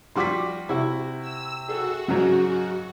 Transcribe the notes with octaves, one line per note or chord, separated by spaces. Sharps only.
F3 G3 F#4 C6 D6 B6
C3 E4 F#4
E6
F#4 G#4 A4
G#2 C#3 F#3